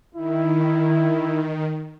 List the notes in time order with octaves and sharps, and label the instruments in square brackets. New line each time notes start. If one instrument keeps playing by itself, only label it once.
[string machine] D#3 [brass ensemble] E4